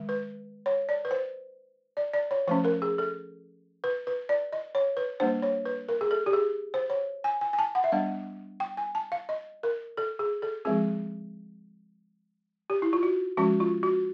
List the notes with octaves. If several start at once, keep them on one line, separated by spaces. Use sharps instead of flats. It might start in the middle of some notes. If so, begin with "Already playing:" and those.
Already playing: D#3 G#3
B4
C#5
D5
B4
C5
D5
D5
C#5
F3 A3 C#4 C5
A#4
G#4
A4
B4
B4
D5
D#5
C#5
B4
G3 A#3 D4 C5
C#5
B4
A#4
G#4
A4
G4
G#4
C5
C#5
G#5
G#5
G#5
A5
F#5
E5
G3 B3 D4 F5
G5
G#5
A5
F5
D#5
A#4
A4
G#4
A4
F3 G#3 C4 G#4
G4
E4
F4
F#4
F3 G#3 C#4 F#4
F4
F#4